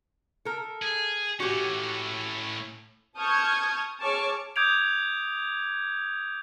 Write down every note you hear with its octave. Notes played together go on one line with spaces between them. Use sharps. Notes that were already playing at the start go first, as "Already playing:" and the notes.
A4 A#4
G#4
A2 C#4 F#4 G4
A5 C#6 D#6 F6 G6 G#6
G#4 C#5 A5 C#6 D6 F6
D6 D#6 G6 G#6 D7 F7